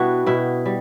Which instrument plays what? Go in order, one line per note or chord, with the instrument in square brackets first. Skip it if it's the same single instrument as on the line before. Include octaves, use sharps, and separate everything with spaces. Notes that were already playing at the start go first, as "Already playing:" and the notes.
Already playing: [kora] B2 G3 B3 D4 E4 F#4
B2 E4
G3